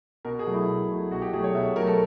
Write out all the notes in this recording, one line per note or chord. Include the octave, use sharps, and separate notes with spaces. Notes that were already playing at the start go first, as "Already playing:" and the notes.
B2 A#4
G#4
F#3 A3
E4
B2
F#3 A3
B2 F#4
G4
F#3 A3 G#4
C#5
B2 E5
F#3 A3 A#4
A4